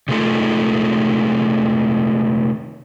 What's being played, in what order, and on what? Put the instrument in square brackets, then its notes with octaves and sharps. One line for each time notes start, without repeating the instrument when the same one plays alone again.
[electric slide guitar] C3 D#3 G#3 A3 F4 A4